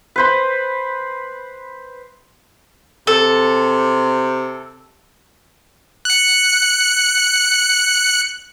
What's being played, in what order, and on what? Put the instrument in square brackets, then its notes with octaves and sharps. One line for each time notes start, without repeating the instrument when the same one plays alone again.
[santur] B4 C5 B5
[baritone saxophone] C3 [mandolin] A4
[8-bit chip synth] F#6 C#7